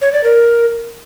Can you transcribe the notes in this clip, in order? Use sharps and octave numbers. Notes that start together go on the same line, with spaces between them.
C#5
D5
A#4